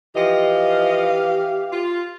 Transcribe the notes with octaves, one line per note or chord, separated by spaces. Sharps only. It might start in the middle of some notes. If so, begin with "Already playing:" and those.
E3 F3 G4 D#5 F5
F4